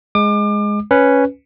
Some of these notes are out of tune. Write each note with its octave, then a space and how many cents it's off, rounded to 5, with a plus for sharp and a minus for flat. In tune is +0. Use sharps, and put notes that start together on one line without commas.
G#3 +0 D6 +35
C#4 +0 B4 +0